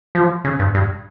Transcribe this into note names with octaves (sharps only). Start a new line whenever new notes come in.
F3
C#3
G2
G2